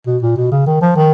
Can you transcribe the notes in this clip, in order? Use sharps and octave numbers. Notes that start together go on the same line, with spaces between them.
B2
A#2
B2
C#3
D#3
F3
D#3